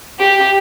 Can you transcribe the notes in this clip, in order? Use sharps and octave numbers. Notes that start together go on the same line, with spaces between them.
G4